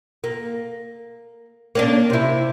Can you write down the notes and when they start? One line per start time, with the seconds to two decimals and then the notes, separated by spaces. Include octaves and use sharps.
0.24 A#3
1.75 A#3 C#4 D4
2.10 C3 E4